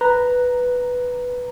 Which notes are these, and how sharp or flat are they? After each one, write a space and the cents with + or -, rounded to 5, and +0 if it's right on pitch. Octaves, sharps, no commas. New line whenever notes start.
B4 +0 A#5 +0